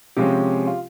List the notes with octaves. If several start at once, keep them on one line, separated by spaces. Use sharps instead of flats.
C3 F3 G#3 C#4 G4
F4